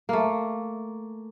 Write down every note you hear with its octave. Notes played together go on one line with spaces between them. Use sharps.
A3 A#3